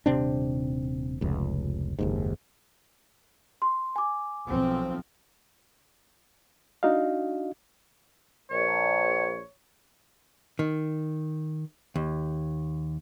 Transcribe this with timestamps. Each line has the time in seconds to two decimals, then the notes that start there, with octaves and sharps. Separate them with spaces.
0.06 D#1 C3 C4 D4
1.21 F1 C#2
1.99 F#1 D#2 G#2
3.62 C6
3.96 G#5 D6
4.48 B1 F3 C4
6.83 D4 D#4 F#4 D#5 F5
8.50 A#1 C#5
10.59 D#3
11.96 D#2